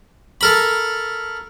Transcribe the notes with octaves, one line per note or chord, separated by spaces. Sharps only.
A4 A#4 B5